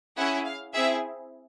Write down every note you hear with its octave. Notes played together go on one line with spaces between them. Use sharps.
C#4 E4 G#4 F#5
F5
C4 E4 G#4 E5